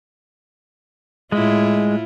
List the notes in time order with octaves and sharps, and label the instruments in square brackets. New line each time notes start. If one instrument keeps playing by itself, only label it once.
[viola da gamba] A2 E4 F4 [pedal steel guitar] G#3